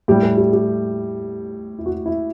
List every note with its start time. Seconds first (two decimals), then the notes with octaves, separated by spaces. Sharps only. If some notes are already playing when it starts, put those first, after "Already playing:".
0.08 A2 G3 G4
0.23 A4
0.37 G4
0.53 G4
1.79 E4
1.86 F#4
2.06 E4